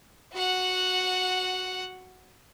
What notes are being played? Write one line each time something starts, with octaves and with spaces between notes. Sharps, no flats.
F#4 F#5